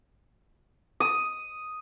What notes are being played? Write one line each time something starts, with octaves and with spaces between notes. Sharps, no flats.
D#6